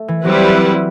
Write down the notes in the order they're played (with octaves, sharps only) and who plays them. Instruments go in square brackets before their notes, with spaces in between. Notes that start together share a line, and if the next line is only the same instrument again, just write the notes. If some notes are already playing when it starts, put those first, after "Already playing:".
Already playing: [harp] A3
E3
[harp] F#3 [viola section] G3 C4 E4 B4